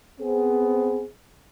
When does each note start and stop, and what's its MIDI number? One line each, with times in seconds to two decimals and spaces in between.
0.21 1.05 59
0.21 1.05 60
0.21 1.05 68